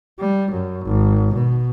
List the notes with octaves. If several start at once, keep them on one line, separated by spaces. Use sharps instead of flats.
G3
F#2
G#1
B2